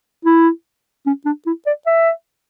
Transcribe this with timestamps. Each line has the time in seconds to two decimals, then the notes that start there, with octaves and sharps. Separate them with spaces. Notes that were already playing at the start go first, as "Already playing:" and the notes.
0.25 E4
1.06 C#4
1.25 D4
1.46 E4
1.66 D5
1.86 E5